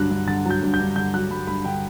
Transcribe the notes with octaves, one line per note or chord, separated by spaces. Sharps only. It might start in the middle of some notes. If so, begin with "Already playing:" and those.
Already playing: G2 D3 F#3 F#6
G2
D3 A6
F#3 G6
G2
G6
G2
D3 G6
F#3 F#6
G2 B5
G2 B5
D3 G5